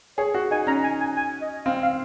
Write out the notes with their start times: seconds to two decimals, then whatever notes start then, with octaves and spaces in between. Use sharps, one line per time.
0.18 G#4 C#5
0.34 F#4
0.51 D#4 G#5
0.67 C#4 A#5
0.84 G#5
1.00 G#5
1.16 G#5
1.41 D#5
1.66 C4 F5
1.83 F5